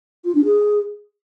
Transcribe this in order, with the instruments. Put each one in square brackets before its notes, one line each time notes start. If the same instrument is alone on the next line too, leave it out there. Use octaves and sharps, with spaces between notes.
[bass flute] F4
D4
G#4